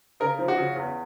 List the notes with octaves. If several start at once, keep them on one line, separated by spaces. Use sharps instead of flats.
C#3 A#4
F3
F#4
C#3
E2